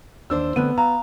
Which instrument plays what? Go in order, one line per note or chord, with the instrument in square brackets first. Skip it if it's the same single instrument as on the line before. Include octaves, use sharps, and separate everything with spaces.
[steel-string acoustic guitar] D#2 D4 C5 [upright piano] E6
[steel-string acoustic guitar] D3 A3 C4 [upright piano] B3 [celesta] F#6 D#7
[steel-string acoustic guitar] F5 [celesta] A#5